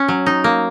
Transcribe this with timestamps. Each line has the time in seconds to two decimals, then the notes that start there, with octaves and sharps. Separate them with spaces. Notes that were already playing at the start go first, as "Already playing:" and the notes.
Already playing: C#4
0.08 F#3
0.26 D#4
0.44 A#3